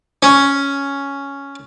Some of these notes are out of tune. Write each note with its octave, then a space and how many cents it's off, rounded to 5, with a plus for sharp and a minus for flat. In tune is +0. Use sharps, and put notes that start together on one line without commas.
C#4 +5